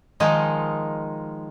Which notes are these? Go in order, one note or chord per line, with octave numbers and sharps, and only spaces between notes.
D#3 F3 G#3 D#4